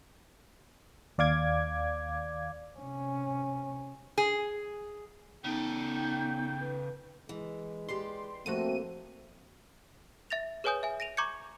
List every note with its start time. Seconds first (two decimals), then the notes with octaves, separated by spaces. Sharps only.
1.18 D#2 D5 F5 D6 G#6
2.79 C3 C#4
4.18 G#4
5.44 C#3 B3 D#4 A4 G5
6.60 B4
7.29 E3 G#3
7.89 G4 B4 D5 C6
8.46 F2 A3 A#3 C4 F#4 A4 D#7
10.30 E5 A6 A#6 F7
10.64 G#4 B4 C#5 G#5 D#6 G6
10.83 E5 G#5
11.00 A#6 D7 D#7 F7
11.17 A#5 C#6 D6 G6 G#6 C#7